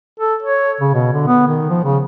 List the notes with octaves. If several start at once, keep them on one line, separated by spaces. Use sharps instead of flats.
A4
C#5
C#3
B2
D3
B3
D#3
F3
C#3